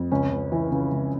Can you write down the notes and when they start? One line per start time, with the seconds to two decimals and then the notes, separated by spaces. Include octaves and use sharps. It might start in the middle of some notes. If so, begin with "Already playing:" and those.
Already playing: F2
0.11 C#2 C#4
0.31 C#2
0.52 E3
0.72 C#3
0.92 C#2